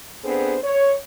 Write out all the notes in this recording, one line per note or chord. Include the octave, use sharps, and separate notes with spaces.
B3 C4 D4 G#4 A4 C5
C#5